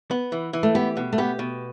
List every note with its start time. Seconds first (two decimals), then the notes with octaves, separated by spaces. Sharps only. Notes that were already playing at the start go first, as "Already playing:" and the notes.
0.11 B3
0.32 E3
0.53 E3
0.63 A3
0.75 B3 G4
0.97 B2
1.13 A3
1.18 B3 G4
1.39 B2